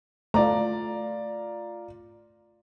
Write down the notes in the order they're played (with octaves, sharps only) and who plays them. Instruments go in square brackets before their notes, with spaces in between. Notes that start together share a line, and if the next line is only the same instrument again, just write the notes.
[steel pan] A3 [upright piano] F4 D5 A#5